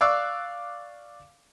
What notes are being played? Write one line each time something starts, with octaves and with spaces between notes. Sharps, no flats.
D5 F5 C#6 D6 E6 F#6